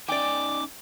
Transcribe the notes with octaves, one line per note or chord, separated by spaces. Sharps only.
C#4 D#4 D5 G5 G#5 D6